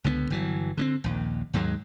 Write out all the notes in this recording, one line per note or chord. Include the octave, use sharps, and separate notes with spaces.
C#2 D3 E3 B3
G1 E3 F#3
D3 A#3 C4
A#1 D#2
D#2 G#2 F#3 G#3